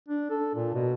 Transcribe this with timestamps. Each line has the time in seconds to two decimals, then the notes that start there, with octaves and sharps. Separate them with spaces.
0.09 D4
0.30 A4
0.55 A#2
0.74 B2